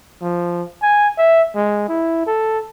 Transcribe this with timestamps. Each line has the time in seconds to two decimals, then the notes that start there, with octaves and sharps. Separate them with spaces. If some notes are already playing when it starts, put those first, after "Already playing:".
0.22 F3
0.82 G#5
1.18 E5
1.55 G#3
1.89 E4
2.26 A4